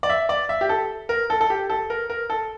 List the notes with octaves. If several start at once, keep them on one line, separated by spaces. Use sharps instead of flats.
D5
E5
D5
E5
G4
A4
A#4
A4
A4
G4
A4
A#4
A#4
A4